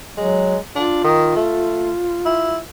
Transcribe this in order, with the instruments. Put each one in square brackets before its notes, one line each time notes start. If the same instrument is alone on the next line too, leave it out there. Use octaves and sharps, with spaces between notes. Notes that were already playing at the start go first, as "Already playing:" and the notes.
[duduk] F#3 [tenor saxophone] G#3
[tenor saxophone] D4 [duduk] F4
[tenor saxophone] D#3
A3
E4